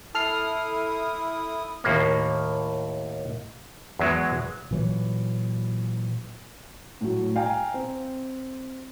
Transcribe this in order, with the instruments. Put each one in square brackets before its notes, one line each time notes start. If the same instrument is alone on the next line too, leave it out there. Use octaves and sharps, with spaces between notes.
[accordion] E4 D#6 [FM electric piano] A4 F6 C7
[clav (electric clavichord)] D#2 A2 A#3
E2 F#3 G#3
[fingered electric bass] A#2 E3 F#3
[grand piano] A2 F#3
F5 G5 G#5 A#5
C4